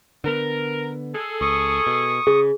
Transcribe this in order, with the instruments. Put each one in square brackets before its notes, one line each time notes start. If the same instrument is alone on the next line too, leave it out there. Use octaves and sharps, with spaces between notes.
[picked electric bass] D3 B3 [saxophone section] A#4
[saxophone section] G#4 A4
[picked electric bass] C#2 [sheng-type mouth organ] C#6 D#6
[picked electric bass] B2
[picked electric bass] C#3 [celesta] G#4